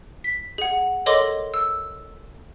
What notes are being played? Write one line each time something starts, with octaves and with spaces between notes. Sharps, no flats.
B6
G#4 F#5
A4 A#4 C#5 D#5 C6 D6
E6